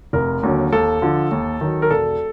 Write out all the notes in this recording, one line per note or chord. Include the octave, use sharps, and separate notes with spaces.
F1 A#4
D#2 D3 F#3
D#2 A4
D3 F3
D#2
D#3 F#3
A#4
E1 A4